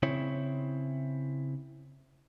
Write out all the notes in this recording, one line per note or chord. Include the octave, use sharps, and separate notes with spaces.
C#3 C4 E4 C#5